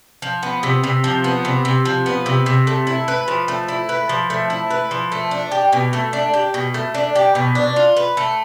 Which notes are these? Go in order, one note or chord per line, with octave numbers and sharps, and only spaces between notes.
F3
B3
C3
C3
F3
B3
C3
C3
F3
B3
C3
C3
A3
E4
B4
F3
A3
E4
B4
F3
A3
E4
B4
F3
A3
D4
G4
B2
A3
D4
G4
B2
A3
D4
G4
B2
D4
F4
B4
A3